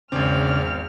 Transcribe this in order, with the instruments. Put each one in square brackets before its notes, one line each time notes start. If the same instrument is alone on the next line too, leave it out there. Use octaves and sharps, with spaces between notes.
[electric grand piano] G#1 C4 [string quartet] E2 F6 [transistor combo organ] C#3 D4